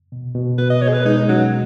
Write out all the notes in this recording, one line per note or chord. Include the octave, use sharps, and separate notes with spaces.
B2
B2
B2 B4
D#5
B2 C#5
G#4
B4
G#3 D#4
F#3 C#4